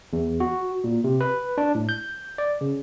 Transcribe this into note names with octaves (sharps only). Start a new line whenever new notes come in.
E2
F#4
A#2
C3
B4
D4
A2
G6
D5
C#3